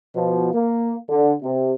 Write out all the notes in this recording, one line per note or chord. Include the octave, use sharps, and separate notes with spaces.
B2 F3
A#3
D3
C3